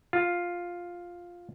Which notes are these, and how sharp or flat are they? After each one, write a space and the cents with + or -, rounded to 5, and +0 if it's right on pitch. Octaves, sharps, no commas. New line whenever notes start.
F4 +5